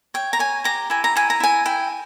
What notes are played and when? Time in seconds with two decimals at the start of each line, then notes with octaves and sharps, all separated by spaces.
0.14 C#5 G5
0.33 A#5
0.39 C#5 G#5
0.64 G4 A#5
0.90 E4 G#5
1.04 A#5
1.15 E4 G#5
1.30 A#5
1.40 E4 G#5
1.65 E4 G5